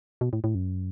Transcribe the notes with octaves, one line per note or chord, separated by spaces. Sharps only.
B2
A2
A2
F#2